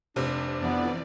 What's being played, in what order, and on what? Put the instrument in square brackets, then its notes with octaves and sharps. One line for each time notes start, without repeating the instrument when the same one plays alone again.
[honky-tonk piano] F1 C3 [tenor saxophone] D4
[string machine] F2 E3 D5 [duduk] B3